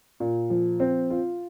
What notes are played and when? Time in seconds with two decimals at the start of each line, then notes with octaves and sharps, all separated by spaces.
0.20 A#2
0.50 F3
0.80 C4
1.10 F4